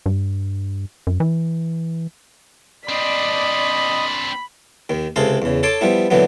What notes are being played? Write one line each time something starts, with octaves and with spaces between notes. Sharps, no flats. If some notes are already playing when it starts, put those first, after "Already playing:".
G2
F#2
E3
C4 D4 D5 D#5 B5 D#6
D#2 D#3
C#2 C3 G#4 A4 F5 C6
E2 C#3
A4 C#5 A5 C6 D6
F3 G3 B3 E4
A#2 D3 E3 F#3 B3